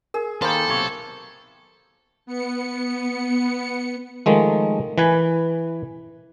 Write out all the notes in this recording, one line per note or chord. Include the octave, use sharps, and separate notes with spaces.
G#4 A#4
D#3 A#3 A4 C5 G5 B5 C6
B1 C3 C#5
B3 C#7
D#3 F3 G#3 A3
E3 B4 G#5